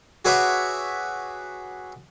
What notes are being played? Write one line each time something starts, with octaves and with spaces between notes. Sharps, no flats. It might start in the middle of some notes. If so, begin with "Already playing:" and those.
F#4 G#4 B4 C#5 E5 D6